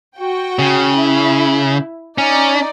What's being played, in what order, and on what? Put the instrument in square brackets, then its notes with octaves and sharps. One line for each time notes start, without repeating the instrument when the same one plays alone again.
[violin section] F#4 G5
[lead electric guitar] C#3
[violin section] E4
[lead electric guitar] C#4 [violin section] D#4 D5